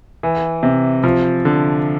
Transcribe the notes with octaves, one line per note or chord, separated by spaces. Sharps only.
E3
C3
F3
D3